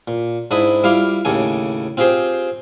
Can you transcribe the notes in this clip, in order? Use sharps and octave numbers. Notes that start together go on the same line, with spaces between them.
A#2
G#2 D4 E4 B5 D#6
G3 E4 F4 F5 D6
D#2 A2 C#3 A4 G#5
C4 F4 G4 G#4 C5